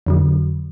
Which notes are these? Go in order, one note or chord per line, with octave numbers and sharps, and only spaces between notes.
F2 D3 F#3